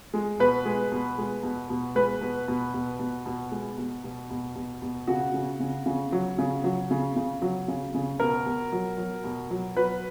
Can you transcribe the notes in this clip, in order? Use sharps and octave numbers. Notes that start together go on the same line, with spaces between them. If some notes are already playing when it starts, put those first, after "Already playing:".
G#3
B2 B4
G#3
B2
G#3
B2
B2
G#3 B4
B2
B2
B2
B2
B2
G#3
B2
B2
B2
B2
B2
C#3 F#4
C#3
C#3
C#3
F#3
C#3
F#3
C#3
C#3
F#3
C#3
C#3
B2 A#4
B2
F#3
F#3
B2
F#3
F#3 B4